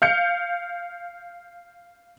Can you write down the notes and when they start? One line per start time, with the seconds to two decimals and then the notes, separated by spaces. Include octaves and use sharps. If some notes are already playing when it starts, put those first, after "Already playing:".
0.02 F5 G6 C#7